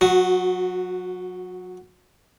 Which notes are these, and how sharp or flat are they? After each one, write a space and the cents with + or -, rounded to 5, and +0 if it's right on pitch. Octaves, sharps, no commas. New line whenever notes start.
F#3 -30 F#4 +0